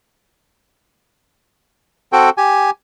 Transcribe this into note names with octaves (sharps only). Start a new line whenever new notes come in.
C4 F#4 A4 G5
G4 G#5